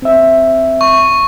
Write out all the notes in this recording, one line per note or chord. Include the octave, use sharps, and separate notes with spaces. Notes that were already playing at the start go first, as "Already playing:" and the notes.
C4 E5
C#6